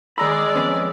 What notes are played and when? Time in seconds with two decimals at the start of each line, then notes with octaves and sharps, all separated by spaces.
0.18 D#3 G#3 D5 A#5 B5 E6
0.55 F2 B3 C#4